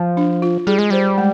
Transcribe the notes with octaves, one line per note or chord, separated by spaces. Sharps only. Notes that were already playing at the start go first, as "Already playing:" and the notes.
Already playing: F3
D4
F4
G3 G#4
G#3
G3 C5
G#3